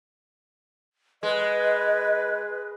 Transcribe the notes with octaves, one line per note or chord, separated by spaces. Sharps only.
G#3 B4 D#5